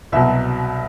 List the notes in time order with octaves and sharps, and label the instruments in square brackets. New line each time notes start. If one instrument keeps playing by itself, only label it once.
[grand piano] C2 B2 F#3 E5